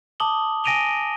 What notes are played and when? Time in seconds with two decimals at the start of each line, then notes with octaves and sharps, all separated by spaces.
0.20 A5 D6 D#6 F#7 G7
0.64 G#5 A#6 D7 D#7 F7 G7